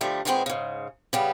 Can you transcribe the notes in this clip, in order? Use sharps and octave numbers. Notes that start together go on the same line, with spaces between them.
D3 F3 G3 A3
A#2 D#3 G3 G#3 B3 C4
G#2 C#3
C#3 G3 B3